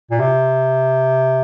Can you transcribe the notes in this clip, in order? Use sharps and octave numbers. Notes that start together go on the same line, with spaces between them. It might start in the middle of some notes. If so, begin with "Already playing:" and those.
A#2
C3